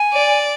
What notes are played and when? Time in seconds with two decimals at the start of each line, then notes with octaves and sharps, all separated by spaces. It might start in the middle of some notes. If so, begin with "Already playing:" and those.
Already playing: G#5
0.13 D5